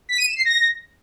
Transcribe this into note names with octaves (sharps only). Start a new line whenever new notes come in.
B6
D#7
E7
C7
A#6